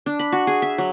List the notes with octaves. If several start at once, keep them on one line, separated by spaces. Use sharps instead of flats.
D4
B5
F#4
G#4
E5
F#3